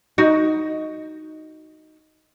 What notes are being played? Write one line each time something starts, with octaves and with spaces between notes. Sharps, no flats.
D#4 F#4